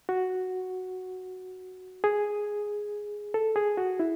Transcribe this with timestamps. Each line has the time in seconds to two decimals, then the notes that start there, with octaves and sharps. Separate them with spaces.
0.09 F#4
2.04 G#4
3.34 A4
3.56 G#4
3.77 F#4
3.99 E4